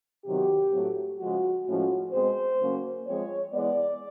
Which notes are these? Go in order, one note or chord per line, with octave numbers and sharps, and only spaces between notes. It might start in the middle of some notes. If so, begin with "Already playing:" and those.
C3 D#3 F#3 B3 G4
A2 F#3 A3 C4
C#3 F3 G#3 F#4
A2 F3 G#3 C#4 F#4
B2 G#3 C4 C5
C#3 F#3 A#3 C#4
F3 G#3 C4 C#5
E3 G#3 B3 D5